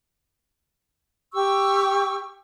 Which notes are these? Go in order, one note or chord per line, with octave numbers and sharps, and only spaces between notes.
G4 C#6 E6